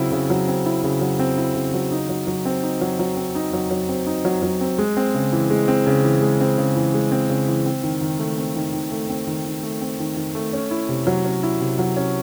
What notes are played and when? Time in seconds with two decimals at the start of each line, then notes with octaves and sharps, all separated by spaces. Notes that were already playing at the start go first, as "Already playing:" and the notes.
Already playing: C#3 F#3 C4 E4
0.12 C#3
0.30 F#3
0.48 C4
0.66 E4
0.84 C#3
1.01 F#3
1.19 C4
1.37 E4
1.55 C#3
1.74 F#3
1.91 D#4
2.09 F#3
2.27 F#3
2.45 C4
2.63 D#4
2.81 F#3
2.99 F#3
3.17 C4
3.35 D#4
3.53 F#3
3.71 F#3
3.89 C4
4.07 D#4
4.25 F#3
4.43 F#3
4.61 C4
4.78 G#3
4.97 C4
5.15 C#3
5.32 E3
5.50 G#3
5.68 C4
5.87 C#3
6.04 E3
6.22 G#3
6.41 C4
6.58 C#3
6.76 E3
6.94 G#3
7.12 C4
7.30 C#3
7.48 E3
7.66 C4
7.83 D#3
8.01 D#3
8.19 A3
8.38 C4
8.56 D#3
8.73 D#3
8.91 A3
9.09 C4
9.27 D#3
9.46 D#3
9.63 A3
9.81 C4
10.00 D#3
10.17 D#3
10.35 A3
10.53 C#4
10.71 E4
10.89 C3
11.07 F#3
11.25 C#4
11.43 E4
11.61 C3
11.79 F#3
11.96 C#4